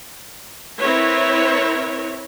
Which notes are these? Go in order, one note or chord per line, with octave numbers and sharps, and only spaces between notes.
C4 E4 A#4 B4 C#5